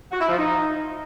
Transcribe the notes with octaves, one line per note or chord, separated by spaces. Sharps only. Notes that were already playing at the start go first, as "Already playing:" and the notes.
F#4
E4
F3
D#4